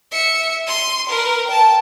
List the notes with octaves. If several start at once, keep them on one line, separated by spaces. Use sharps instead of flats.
E5 C#7
C6 D#7
A#4 B4
G5 A5